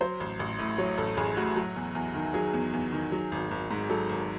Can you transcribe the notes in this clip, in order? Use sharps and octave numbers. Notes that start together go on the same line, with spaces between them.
F#3 C5
A1
A1
A2
F#3 C#5
A1 A4
A1 G#4
A2 F#4
F#3
E2
E2
D#3
F#3 G#4
E2
E2
D#3
F#3
G#1
G#1
G#2
F#3 A4
G#1